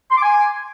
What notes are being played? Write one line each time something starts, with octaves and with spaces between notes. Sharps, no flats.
C6
D6
G#5